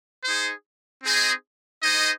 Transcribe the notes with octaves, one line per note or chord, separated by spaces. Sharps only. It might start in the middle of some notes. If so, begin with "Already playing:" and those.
D#4 G#4 C5
C4 D#4 G#4 C5 D#5
D#4 G#4 C5 D#5